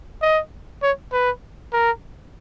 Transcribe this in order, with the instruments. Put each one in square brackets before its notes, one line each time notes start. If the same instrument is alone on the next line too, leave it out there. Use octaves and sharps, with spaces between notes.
[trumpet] D#5
C#5
B4
A#4